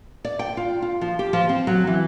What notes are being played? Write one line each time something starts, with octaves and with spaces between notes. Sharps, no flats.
D5
G5
F4
F4
F3
G4
F3
C4
F#3
E3